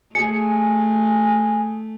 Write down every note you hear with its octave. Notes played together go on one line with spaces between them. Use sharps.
A3 G#4 G#5 C#7